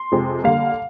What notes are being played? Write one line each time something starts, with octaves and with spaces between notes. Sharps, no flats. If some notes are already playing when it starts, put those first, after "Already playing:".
Already playing: C6
F2 C3 F3 G#3
D3 G3 A#3 F5